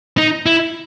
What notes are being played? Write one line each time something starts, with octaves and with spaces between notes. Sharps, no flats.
D#4
E4